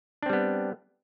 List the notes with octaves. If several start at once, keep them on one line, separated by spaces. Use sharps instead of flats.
G3 B3 C4 D4